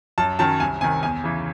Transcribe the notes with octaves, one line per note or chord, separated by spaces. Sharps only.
F#2 A5
D#3 F#3 C#4 A5
C2 G#5
C3 D#3 G#5
E2 G#5
C#3 E3